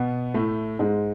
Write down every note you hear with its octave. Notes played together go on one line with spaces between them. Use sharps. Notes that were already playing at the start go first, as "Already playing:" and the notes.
Already playing: B2 B3
A2 A3
G#2 G#3